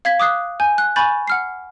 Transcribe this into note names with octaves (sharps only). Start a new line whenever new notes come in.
F5 G#6 B6
D6 D#6 F#6 C7
G#5 G6
F#6
G#5 B5 C#6 G6 A6
F#5 F6 C7